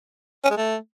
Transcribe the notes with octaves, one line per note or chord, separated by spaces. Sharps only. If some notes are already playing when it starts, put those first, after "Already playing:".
C#4
G#3
A3